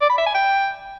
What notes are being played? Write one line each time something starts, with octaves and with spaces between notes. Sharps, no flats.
D5
B5
E5
G#5
G5